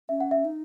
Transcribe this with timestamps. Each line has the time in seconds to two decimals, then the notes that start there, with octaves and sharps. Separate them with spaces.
0.09 C#4 E5
0.20 F#5
0.31 E5
0.45 D#4